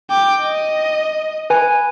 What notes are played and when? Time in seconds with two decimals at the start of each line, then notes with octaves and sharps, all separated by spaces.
0.10 G5 D6
0.42 D#5
1.50 B4 G#5